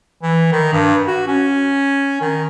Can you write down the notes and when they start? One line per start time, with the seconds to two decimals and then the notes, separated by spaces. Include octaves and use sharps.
0.23 E3
0.52 D#3
0.73 G2
1.07 F#4
1.28 C#4
2.21 D#3